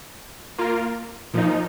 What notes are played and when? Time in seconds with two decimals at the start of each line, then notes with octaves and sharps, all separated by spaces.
0.58 A#3 F4 A#4
1.34 A#2 F3 D#4